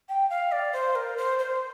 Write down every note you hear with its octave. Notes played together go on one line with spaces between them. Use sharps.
G5
F5
D5
C5
A#4
C5
C5